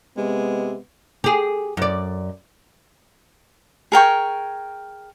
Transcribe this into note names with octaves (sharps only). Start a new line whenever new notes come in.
C3 G#3 B3
G4 G#4
F#2 D5
G#4 A#4 G5 C#6